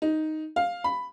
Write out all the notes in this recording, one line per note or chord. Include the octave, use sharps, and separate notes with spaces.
D#4
F5
B5